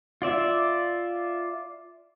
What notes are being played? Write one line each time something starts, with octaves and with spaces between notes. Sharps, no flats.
F4 D5 E5